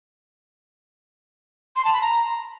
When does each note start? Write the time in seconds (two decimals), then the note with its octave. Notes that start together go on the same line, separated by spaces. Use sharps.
1.76 C6
1.85 A5
1.93 B5
2.02 A#5